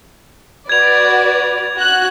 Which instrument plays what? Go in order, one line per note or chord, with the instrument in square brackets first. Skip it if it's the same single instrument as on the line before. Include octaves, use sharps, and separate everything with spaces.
[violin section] F#4 B4 D5 [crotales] G#6 F7
[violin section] F#4 F#6